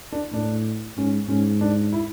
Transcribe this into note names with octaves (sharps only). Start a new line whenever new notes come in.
D4
A2 D4
G#2 C#4
G#2 C#4
D4
E4